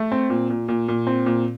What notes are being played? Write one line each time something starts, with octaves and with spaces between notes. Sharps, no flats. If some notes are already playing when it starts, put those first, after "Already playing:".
Already playing: A3
C4
A#2
A#2
A#2
A#2
C4
A#2